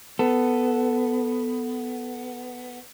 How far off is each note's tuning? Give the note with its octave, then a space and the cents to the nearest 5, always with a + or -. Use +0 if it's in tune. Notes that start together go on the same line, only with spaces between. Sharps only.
B3 +5 A4 +0